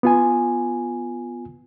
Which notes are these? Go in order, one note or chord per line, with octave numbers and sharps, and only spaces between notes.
B3 F4 G#5